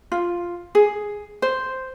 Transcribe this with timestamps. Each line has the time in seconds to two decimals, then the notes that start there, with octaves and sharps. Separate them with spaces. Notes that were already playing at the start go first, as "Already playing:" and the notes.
0.12 F4
0.75 G#4
1.42 C5